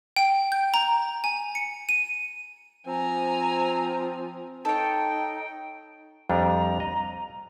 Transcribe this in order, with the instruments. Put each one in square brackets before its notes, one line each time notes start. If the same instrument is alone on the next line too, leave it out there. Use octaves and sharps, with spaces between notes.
[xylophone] G5
G6
A#5
G#5
C#7
D#7
[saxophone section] F3 C4 [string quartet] G#5 A#5
[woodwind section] D#4 G5 [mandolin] A4 C#5
[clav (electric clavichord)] F2 G3 D4 [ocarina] A#5
[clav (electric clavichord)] D#5